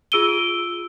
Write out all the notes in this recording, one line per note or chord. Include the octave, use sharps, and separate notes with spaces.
F4 G#4 E6 D7 D#7 G7